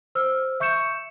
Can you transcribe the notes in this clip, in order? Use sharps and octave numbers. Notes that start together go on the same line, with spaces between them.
C5 E6 F6
E5 C#6 G6 C#7 E7